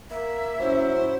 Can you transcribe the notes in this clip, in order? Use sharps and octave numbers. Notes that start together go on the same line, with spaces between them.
A#3 E5
F#3 C#4 E4 C5